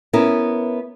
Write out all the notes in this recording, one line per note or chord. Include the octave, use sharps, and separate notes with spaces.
B3 C#4 E4 A#4